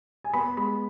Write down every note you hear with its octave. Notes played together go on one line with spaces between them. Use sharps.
G#5
B3 B5
G#3 B5